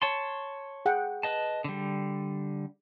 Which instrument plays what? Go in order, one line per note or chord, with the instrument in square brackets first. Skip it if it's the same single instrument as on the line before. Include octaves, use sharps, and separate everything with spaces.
[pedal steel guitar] C#5 A5 C6
[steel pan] G#4 F#5 G5
[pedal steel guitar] B4 D#5 A5
D3 G3